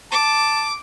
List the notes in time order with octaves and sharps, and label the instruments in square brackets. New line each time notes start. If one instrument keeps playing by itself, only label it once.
[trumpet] A5 [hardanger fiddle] D6